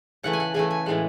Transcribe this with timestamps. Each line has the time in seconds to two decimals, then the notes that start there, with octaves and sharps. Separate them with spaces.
0.23 C#3 E3 A3 F#5
0.33 G#5
0.40 F#5
0.54 C#3 E3 A3 G#5
0.71 G#5
0.86 A2 E3 G#3 F#5